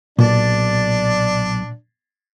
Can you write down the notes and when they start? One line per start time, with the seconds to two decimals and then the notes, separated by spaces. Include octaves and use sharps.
0.19 B1 A#2 D4 D5